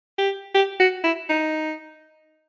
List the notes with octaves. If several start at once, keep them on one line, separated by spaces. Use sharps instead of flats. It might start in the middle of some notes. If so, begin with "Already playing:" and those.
G4
G4
F#4
E4
D#4